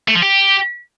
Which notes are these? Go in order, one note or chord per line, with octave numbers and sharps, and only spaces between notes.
A3
F3
G4